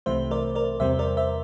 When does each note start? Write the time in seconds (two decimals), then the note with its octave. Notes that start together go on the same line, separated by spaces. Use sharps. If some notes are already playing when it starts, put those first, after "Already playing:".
0.06 C2 C3 E3 A3 C5 E5
0.31 A#4 D5
0.55 A#4 D5
0.80 E2 C3 G3 C4 C5 E5
0.99 A#4 D5
1.17 C5 E5